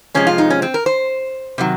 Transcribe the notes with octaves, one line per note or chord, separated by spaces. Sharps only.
C3 F3 G#3 C#4
F4
D#4
C#4
C4
A#4
C5
C3 D#3 F#3